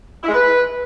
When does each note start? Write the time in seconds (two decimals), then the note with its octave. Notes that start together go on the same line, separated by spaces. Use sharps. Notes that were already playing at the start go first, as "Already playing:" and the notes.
0.23 E4
0.28 G#3
0.33 B4